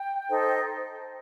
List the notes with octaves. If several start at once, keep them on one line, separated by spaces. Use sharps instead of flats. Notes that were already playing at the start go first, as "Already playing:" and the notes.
Already playing: G5
D#4 A4 C5